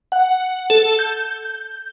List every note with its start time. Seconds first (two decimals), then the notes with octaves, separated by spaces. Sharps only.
0.12 F#5
0.70 A4
0.99 G6